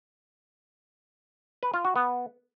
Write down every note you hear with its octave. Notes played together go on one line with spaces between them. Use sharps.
B4
F4
F#4
B3